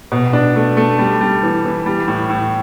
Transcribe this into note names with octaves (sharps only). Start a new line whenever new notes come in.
B2
D4
A3
A3
G3
G3
E3
E3
G3
A2
A2